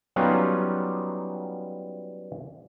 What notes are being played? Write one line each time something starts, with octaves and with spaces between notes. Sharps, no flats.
F#3 G3 B3 C#4 D#4 F4